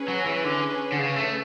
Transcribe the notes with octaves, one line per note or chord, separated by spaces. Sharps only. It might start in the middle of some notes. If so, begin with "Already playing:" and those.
Already playing: C#4 G#4 B4
F#3
E3
D3
D3
C#3
A3